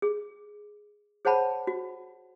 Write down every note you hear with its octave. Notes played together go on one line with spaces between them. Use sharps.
G#4
G#4 C5 C#5 F#5 A5 B5
F#4